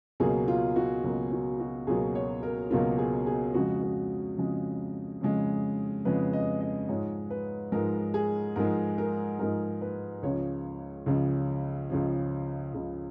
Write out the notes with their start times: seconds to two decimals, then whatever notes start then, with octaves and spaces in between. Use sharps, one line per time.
0.20 C#2 B2 F#3 A#3 G#4
0.48 F4
0.76 F#4
1.04 C#2 B2 F#3 A#3 F4
1.32 F#4
1.60 F#4
1.87 C#2 B2 F#3 A#3 G#4
2.15 C#5
2.43 A#4
2.71 C#2 B2 F#3 A#3 F4
2.98 G#4
3.26 G#4
3.54 F2 C#3 G#3 F#4
3.82 F#4
4.38 F2 C#3 G#3
5.21 F2 C#3 G#3
6.05 F2 C#3 G#3 B4
6.33 D#5
6.61 D#5
6.89 G#2 F3 G#3 C#5
7.30 B4
7.72 G#2 F3 G#3 A#4
8.14 G#4
8.56 G#2 F3 G#3 A#4
8.98 A#4
9.39 G#2 F3 G#3 A#4
9.81 B4
10.23 C#2 C#3 F3 C#5
11.06 C#2 C#3 F3
11.90 C#2 C#3 F3
12.74 C#2 C#3 F3